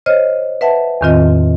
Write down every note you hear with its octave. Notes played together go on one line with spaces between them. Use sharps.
C5 C#5 D#5 F6
B4 E5 F#5 A5
E2 A2 D#3 C4 F4 D#5